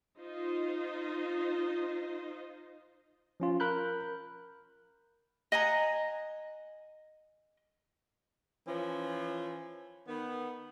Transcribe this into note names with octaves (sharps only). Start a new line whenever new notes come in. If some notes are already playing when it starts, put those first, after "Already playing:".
D#4 F4 C5 D#5
F3 C#4 F4
A#4 B5 F#6 G6
D#5 F#5 G#5 A#5
E3 F3 C#4
D#3 B3